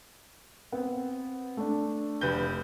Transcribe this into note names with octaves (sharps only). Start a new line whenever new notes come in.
B3 C4
A3 D4
F1 B4 G6